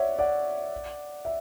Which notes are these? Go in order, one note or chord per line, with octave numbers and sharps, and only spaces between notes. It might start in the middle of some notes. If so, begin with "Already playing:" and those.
Already playing: C#5 D5 E5 F#5
D5 F#5
E5